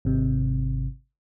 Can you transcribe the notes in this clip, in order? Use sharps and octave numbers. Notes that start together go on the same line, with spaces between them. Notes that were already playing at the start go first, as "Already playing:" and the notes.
G#1 C3